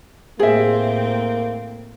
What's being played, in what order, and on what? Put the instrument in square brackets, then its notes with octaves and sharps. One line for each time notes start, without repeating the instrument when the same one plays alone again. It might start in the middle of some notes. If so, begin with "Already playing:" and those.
[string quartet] A2 C4 [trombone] A#3 [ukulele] G#4 E5